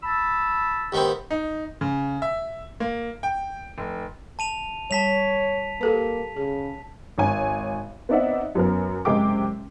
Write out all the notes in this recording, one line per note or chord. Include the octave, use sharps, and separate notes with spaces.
A5 B5 E6
D#2 B3 C4
D#4
C#3
E5
A#3
G5
F1
A5 D#7 F7
G3 C#5 A5 B6 F7
A#3 G4 A4 B4
C#3 G#4
G#1 C#5 G#5
B3 C4 D#4 D5 E5 F#5
F#2 F#3 B3 A#4
F#1 C3 G#3 G5 D6